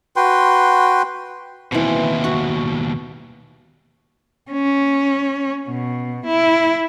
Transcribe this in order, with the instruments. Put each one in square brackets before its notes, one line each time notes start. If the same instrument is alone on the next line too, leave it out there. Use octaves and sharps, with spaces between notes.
[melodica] F#4 B4 G5 C6
[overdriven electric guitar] D#2 B2 [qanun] E3 C4
[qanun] F#4 C#6
[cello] C#4
B2
E4